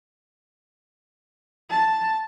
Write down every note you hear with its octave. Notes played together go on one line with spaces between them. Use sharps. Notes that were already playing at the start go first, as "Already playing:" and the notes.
A5